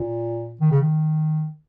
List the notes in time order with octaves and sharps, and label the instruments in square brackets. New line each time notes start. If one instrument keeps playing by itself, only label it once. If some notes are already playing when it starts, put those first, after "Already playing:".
Already playing: [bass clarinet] A#2
D#3
C#3
D#3